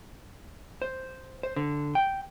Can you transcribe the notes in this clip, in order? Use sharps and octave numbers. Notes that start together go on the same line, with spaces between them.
C5
C5
D3
G5